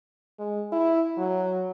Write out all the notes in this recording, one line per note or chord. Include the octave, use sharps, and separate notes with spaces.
G#3
E4
F#3